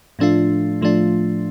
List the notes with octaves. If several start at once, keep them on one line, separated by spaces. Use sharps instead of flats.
A2 F3 A3 D4 F4
A2 F3 A3 D4 F4